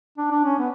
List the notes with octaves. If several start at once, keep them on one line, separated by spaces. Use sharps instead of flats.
D4
D4
C#4
B3